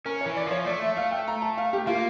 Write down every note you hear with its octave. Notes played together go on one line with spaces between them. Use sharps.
C#4 A#4
C#5
E3
D5
F3 C#5
A3 D5
E5
F5
G5
A#5
A5
F5
G4
A#3 F4